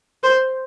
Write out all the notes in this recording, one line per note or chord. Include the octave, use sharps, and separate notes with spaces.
C5